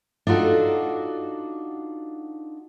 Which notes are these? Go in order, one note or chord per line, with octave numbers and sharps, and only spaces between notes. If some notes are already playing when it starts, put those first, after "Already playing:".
D4 D#4 F4 F#4 A4